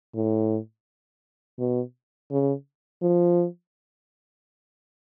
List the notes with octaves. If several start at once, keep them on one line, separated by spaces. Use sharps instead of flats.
A2
B2
C#3
F3